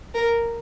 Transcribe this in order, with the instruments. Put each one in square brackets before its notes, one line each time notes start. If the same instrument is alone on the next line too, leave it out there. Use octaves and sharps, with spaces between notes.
[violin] A#4